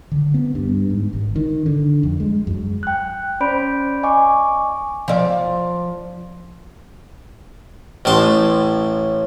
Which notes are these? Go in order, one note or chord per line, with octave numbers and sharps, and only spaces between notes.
D3
B3
G2
G#2
G#1
D#3
D3
F2
G#3
F#2
G5 F#6
C#4 C5 D5 B5 G6 D7
D#5 G#5 C#6 D6
F3 D5
A1 A2 A5 C6